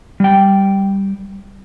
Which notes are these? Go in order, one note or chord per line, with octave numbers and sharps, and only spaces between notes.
G3 G5